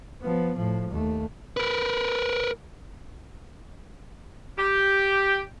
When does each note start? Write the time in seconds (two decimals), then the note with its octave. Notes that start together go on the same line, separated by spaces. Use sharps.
0.22 F3 B3
0.56 A2 F3
0.91 D#2 A3
1.57 A#4 B4
4.58 G4